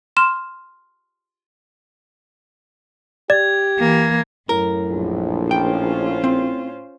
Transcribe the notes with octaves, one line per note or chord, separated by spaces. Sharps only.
C6 F6 E7
G4 D5 G#6
E3 A#3
F#2 A2 A#4
A#1
C#4 F4 C5 G5
C4